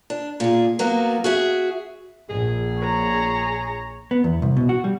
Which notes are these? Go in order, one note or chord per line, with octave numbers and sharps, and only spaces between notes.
D4
A#2 G#4
F#3 A#3 B3 F#4
F#4 G#4 E5
A#1 G#4
C#5 A#5
B3
E2
C2
B2
F#4
G3